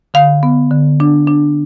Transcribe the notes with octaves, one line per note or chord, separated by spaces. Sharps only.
D3 F5
B3
D3
D4
D4